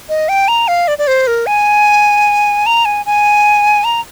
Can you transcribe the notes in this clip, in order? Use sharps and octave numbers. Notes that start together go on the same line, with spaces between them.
D#5
G5
A#5
F5
D5
D5
C5
A#4
G#5
A#5
G#5
G#5
A#5